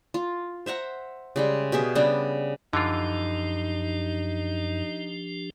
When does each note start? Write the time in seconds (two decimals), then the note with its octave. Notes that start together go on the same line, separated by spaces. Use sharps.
0.14 F4
0.66 C5 E5 F#5 A#5
1.36 C#3 G3 G#3
1.72 B2 G4 G#4 E5
1.95 C#3 G3 B3 D4
2.73 F#2 D3 E3 F3 D4 D#4 F4 G4